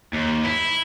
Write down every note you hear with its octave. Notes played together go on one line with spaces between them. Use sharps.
D#2
E4